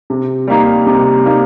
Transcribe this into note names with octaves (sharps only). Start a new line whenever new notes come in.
C3
G3 A#3 D#4
C3
G3 A#3 D#4